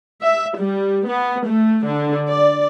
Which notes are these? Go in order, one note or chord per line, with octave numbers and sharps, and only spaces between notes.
E5
G3
B3
A3
D3
D5